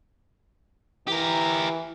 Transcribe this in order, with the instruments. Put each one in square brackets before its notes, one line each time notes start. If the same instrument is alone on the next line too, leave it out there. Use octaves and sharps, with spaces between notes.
[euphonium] E3 [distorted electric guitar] G4 A#4